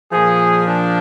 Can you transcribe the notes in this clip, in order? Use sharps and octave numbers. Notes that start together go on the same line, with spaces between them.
A#2 F3 G#4
D4